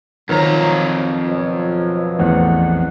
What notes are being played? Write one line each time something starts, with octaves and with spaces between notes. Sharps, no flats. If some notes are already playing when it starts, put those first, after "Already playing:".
F2 D#3 F3 F#3 A#5
B2 F3 F#3
A1 E2 F#5